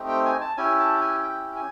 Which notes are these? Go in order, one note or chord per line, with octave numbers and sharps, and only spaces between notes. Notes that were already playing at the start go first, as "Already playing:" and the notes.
Already playing: A3 C4 D#4 G4
G5
G#5
A5
C#4 E4 G4 G#5
A5
G#5
G5
G#5